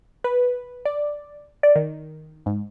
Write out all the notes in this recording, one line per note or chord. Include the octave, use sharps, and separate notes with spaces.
B4
D5
D5
D#3
G#2